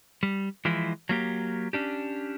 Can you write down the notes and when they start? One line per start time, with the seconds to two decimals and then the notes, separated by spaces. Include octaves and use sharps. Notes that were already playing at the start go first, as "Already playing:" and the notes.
0.23 G3
0.65 E3 F3 G#3 E4
1.09 F#3 A#3 G4
1.73 C#4 D4 G4